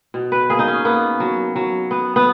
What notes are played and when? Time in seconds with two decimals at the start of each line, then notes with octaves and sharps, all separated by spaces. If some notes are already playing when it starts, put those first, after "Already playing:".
0.14 B2
0.32 B4
0.50 A#3 G#4
0.59 D#4
0.67 C#4
0.85 A#3 B3
1.20 F#3
1.56 F#3
1.91 B3
2.16 B3